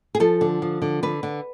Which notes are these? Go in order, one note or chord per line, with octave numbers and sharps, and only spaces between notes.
G#4
F3 A4
D3
F3
D3
D3 B4
D3